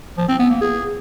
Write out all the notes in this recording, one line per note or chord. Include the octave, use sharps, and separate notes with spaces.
F3
C4
B3
A#3
G#4